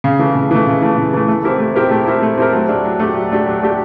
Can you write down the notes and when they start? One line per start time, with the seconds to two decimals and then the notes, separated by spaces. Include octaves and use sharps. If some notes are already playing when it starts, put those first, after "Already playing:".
0.04 C#3
0.19 E3 A3
0.35 C#3
0.51 E3 A3
0.67 C#3
0.82 E3 A3
0.98 C#3
1.14 E3 A3
1.28 A3
1.44 C4 E4 G4 A#4
1.60 A3
1.75 C4 E4 G4 A#4
1.91 A3
2.07 C4 E4 G4 A#4
2.23 A3
2.38 C4 E4 G4 A#4
2.53 F#3
2.69 A3 D4 G4
2.84 F#3
3.00 A3 D4 G4
3.16 F#3
3.31 A3 D4 G4
3.46 F#3
3.62 A3 D4 G4